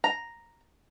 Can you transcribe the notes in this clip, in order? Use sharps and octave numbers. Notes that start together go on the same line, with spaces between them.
A#5